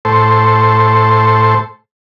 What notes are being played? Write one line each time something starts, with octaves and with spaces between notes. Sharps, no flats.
A2 A4 C5